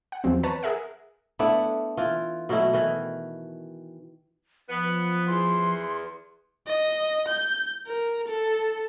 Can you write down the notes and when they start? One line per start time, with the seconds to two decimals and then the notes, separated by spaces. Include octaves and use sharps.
0.12 F#5
0.24 E2 F3 F#3 C4
0.43 B4 C#5 A5 A#5
0.63 G#4 A#4 E5 F#5
1.39 A3 B3 D4 E4
1.97 E3 F4
2.49 B2 F#3 A3 E4
2.73 D#3 E3
4.69 F3 B3
5.28 E2 C6
6.67 D#5
7.28 G6
7.87 A#4
8.28 A4